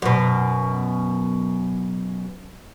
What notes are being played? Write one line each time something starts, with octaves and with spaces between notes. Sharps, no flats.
F#2 B2